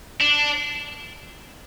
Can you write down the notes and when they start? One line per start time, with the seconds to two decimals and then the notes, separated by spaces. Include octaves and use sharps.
0.21 D4